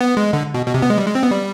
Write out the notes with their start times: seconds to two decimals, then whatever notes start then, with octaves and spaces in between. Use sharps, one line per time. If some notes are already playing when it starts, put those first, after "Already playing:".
0.01 B3
0.17 G#3
0.33 D3
0.54 B2
0.66 B2
0.74 C3
0.82 B3
0.90 G#3
0.98 G3
1.07 G#3
1.15 C4
1.23 B3
1.31 G3